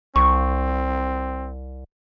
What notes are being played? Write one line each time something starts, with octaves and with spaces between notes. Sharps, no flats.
C2 C4 C#6